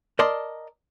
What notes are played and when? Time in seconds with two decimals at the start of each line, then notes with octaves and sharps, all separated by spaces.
0.19 A#4 D5 D#5 A5 C6